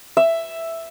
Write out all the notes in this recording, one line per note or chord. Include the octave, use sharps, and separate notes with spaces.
E5